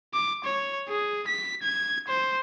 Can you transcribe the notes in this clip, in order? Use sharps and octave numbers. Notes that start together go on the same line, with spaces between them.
D6
C#5
G#4
B6
G#6
C5